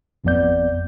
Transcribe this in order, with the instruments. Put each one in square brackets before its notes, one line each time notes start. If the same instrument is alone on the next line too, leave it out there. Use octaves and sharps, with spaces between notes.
[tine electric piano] G#1 F2 F3 B3 D5 G6